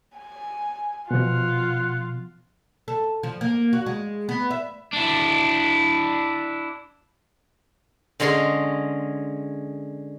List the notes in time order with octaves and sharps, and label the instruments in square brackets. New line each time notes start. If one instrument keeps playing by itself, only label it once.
[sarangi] G#5
[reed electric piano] B2 F3 [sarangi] F4 [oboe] F#5
[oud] A4
F3
A#3
F#4
G#3
B3
E5
[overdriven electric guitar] D4 E4
[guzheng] D3 G#3 C#4 G#4 C6